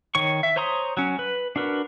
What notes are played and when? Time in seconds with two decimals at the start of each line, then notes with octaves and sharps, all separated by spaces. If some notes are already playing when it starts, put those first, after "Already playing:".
0.15 D#3 C#5 C#6
0.43 E5
0.56 C5 C#5 A#5 C6 D#6
0.97 F#3 C#4
1.19 B4
1.56 D4 F#4 A#4 B4